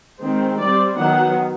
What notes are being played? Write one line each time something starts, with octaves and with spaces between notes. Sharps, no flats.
D#3 G#3 C4
G3 C4 D5
D#3 F#3 B3 F#5